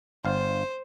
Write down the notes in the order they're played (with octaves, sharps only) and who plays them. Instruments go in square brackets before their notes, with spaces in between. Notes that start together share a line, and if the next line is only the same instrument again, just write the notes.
[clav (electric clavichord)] G1 F5 [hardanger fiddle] C5